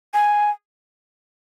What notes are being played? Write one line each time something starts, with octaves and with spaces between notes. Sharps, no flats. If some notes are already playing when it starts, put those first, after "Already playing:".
G#5